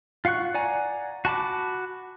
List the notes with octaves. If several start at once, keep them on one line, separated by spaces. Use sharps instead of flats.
F4 F5 F#5 C#6 F#6
D5 F#5 G#5 A#5
F#4 A5 B5 D6